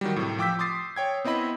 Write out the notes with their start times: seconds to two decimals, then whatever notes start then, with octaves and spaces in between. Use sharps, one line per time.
0.01 D#3 F#3 G3
0.16 A2 C3
0.38 F3 G5 D6 E6 G6 B6
0.59 C6 D6 D#6 A6 C7
0.96 C#5 G5 G#6
1.25 B3 C4 E4 D#5 B5